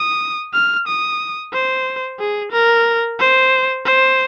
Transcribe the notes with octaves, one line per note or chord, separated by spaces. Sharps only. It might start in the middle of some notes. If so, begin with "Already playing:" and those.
Already playing: D#6
F6
D#6
C5
G#4
A#4
C5
C5